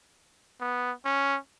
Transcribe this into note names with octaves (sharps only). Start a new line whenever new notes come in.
B3
C#4